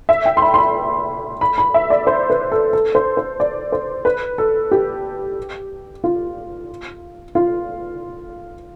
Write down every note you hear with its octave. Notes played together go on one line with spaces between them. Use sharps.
E5
G5
C6
B5
C6
B5
B5
B5
E5
D5
C5
B4
A4
A4
C5
C5
D5
C5
B4
A4
G4
F4
F4